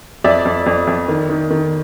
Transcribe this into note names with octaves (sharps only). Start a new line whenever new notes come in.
F2 D5 E5
F2
F2
F2
D#3
D#3
D#3